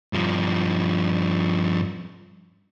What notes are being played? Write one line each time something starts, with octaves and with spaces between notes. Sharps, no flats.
G2 F3